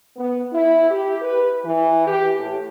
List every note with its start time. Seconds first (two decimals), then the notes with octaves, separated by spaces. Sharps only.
0.17 B3
0.52 E4
0.89 G4
1.20 B4
1.63 E3
2.06 G4
2.37 A2